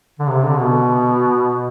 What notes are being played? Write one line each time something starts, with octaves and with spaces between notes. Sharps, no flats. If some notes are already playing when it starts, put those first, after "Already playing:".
D3
C3
D3
B2